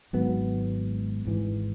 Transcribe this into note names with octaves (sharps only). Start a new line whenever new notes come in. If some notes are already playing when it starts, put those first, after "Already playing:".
G#1 G#2 F#3 B3
G#1 G#2 E3